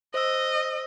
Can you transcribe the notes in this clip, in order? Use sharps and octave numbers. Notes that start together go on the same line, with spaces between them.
C5 D#5 E6